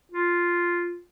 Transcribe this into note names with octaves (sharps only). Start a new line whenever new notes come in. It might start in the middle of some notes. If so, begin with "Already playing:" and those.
F4